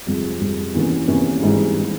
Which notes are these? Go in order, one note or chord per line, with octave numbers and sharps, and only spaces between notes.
F2 C3 F3 G#3
F2 C3 F3 G#3
E2 C3 E3 A#3 C#4
E2 C3 E3 A#3 C#4
G#1 G#2 E3 G3
E3 G3